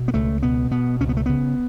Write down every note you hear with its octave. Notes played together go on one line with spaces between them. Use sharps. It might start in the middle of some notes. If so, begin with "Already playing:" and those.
Already playing: B2
B3
C#2 A3
B2 B3
B2 B3
C#2 C#4
B3
A3
C#3 B3